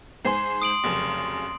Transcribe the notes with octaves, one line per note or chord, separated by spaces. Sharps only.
G#2 C5 G#5 C6 C7
D#6 D7 F#7
F1 F#2 C#3